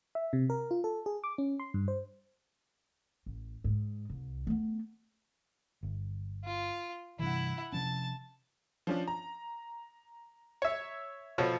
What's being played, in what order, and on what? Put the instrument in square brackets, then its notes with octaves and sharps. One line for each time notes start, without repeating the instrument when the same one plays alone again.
[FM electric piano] E5
C3
A#4
F4
A4
G#4
D6
C#4
C6
G2
C5
[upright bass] A1
G#2
C2
A3 B3
[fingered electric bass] G1
[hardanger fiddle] F4
[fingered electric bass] G2 C3 E3 [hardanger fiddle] E4 F#5
[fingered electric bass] C3 F3 C#4 [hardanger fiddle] A5
[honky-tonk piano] F3 C#4 D4
A#5
[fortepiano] C#5 E5
[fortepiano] B2 F3 A4 [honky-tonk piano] C#5